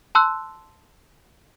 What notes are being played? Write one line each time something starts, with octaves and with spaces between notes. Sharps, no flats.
A5 C6 E6 F#6